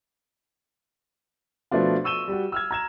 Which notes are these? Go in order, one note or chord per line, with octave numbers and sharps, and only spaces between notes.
B2 F3 A3 B3 D4 F4
C#6 E6 D#7 E7 G7
G3 F#4
E6 F6 G#6
A#5 G#6 E7